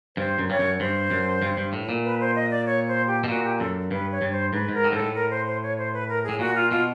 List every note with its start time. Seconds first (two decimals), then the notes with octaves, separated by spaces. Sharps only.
0.17 G2 C5
0.38 F#2
0.49 G2 C#5
0.59 F#2
0.80 G2 C5
1.11 F#2
1.42 G2
1.57 G2
1.73 A2
1.89 A#2
2.04 B4
2.20 C5
2.35 D#5
2.51 D5
2.66 C#5
2.88 C5
3.07 G4
3.24 B2
3.28 A#2 F#4
3.44 G4
3.59 F#2 A4
3.91 G2 B4
4.12 C#5
4.21 G2
4.32 C5
4.53 G#2 B4
4.69 G#2 A#4
4.84 A2
4.92 G#2 A4
5.00 A2
5.15 A#4
5.30 C5
5.46 C5
5.62 C#5
5.78 C5
5.93 B4
6.09 A#4
6.24 G#4
6.29 A2
6.39 A#2 F#4
6.55 F4
6.71 B2 F4